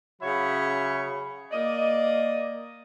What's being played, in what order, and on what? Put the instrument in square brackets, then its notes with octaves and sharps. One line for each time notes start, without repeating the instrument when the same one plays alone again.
[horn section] C#3 F#3 C#5 E5 B5
A#3 D5 D#5